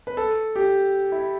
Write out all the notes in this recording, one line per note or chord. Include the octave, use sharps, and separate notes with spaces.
B4
A4
G4
E4